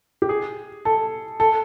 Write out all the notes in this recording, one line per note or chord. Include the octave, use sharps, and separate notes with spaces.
G4
G#4
A4
A4